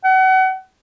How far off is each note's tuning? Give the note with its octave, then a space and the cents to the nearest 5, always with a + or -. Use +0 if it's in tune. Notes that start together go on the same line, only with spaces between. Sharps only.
F#5 +30